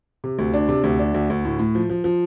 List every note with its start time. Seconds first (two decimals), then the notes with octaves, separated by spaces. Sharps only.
0.24 C3
0.39 D2
0.54 D4
0.69 C3
0.84 D2
0.99 D4
1.14 D2
1.30 D2
1.45 A2
1.59 A2
1.75 F3
1.90 F3
2.04 F3